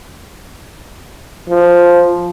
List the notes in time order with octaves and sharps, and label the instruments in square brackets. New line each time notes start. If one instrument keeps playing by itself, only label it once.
[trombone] F3